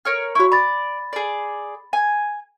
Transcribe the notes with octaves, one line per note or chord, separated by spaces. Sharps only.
A#4 C#5 F6
E4 F#4 C#5 C#6
D5 B5 A6
G#4 D5
G#5